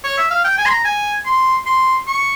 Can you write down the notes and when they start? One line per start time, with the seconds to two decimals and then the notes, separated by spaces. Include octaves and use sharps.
0.04 C#5
0.18 E5
0.31 F5
0.44 G5
0.58 G#5
0.66 C6
0.71 A#5
0.85 G#5
1.26 C6
1.66 C6
2.07 C#6